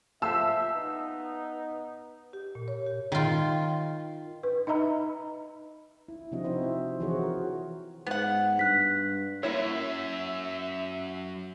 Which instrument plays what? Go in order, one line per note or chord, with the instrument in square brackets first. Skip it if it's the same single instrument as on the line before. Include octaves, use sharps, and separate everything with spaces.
[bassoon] F3 [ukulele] G4 F5 A5 [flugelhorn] E5 [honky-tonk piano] E6
[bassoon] B3 [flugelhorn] D#4
[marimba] G4
A#2
C#5
G4
[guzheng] D#3 F4
[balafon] B4
D#4 D#5 E5 A#5 B5
[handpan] E4
C3 F3 C4 D4 F#4 D#5
C4 D#4 E4 C5
C5 E5
E3 F3 F#4 G#4 C5 C#5
F#4 A#4
[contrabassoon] G#2 [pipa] B3 F#5
[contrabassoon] G2 [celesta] F#6 B6
[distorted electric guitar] F#2 [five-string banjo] A#3 E4 C#5 [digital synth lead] E5